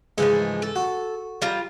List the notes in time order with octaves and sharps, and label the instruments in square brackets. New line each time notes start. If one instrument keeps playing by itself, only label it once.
[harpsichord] G#2 C#3 E3 [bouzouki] F3 G#3 A3
[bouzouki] A4
[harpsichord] F#4
[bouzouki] G3 F4 A#5